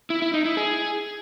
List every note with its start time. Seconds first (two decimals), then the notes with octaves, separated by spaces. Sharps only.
0.10 E4
0.22 E4
0.34 D#4
0.45 E4
0.57 G#4